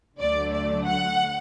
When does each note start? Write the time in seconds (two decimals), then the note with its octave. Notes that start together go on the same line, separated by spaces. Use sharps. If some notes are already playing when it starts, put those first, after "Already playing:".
0.19 D2 D3 F#3 A3 D5
0.52 D5
0.85 F#5